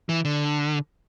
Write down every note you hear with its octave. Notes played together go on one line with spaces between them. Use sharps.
E3
D3